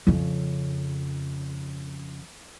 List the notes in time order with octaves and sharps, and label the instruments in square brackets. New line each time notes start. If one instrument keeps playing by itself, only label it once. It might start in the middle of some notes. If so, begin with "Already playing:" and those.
[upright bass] F2 C#3